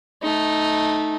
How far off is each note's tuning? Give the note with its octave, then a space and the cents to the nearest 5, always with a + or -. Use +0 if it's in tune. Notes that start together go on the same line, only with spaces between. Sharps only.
A3 -15 D#4 +0